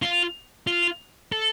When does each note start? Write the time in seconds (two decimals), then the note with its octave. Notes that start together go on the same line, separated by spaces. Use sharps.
0.02 F4
0.67 F4
1.32 A4